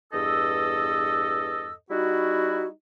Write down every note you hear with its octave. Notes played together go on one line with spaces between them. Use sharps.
E2 G2 A4 D#5 E6
G3 D#4 E4 F#4